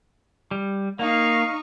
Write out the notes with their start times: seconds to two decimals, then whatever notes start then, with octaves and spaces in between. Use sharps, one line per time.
0.51 G3
0.99 A#3 D#4 F5 C#6